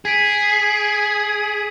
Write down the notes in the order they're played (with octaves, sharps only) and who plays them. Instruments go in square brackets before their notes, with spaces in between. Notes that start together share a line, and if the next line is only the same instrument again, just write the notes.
[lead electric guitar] G#4 [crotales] G#6 B6 D7